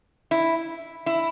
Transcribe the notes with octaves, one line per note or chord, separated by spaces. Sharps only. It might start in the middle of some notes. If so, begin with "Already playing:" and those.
E4
E4